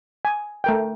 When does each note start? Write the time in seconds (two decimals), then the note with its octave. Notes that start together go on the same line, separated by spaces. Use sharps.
0.25 G#5
0.64 A3 A#4 G5